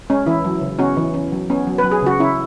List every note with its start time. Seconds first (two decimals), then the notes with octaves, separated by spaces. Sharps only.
0.10 G#3 C#4
0.26 E3 E4
0.45 F#3
0.61 C#3
0.79 B3 C#4 F#4
0.97 E3
1.14 C#4
1.32 F#3
1.50 B3 C#4
1.67 F#3
1.78 B4
1.84 F#3
1.92 G#4
2.02 C#3 F#4
2.20 C#4 E4